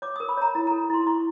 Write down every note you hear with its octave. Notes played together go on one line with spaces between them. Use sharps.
C#5 D6
D#6
A#4
B5
C#5 A#5
E4 A#5
A#5
A4
E4 C6
E4 C#6